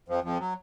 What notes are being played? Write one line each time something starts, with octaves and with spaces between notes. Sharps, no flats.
F2 F3
F2 F3
F#3